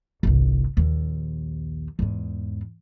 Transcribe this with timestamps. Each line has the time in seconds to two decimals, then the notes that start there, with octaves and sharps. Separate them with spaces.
0.23 G1 C2
0.77 A#1 D#2
1.99 E2 G#2